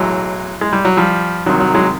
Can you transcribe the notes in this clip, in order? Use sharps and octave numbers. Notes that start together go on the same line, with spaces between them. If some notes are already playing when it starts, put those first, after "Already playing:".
Already playing: B1 A2 E3 F#3 G#3
G#3
G3
F#3
F3 G3
C2 C3 D#3 F#3
F#3
F#3 G#3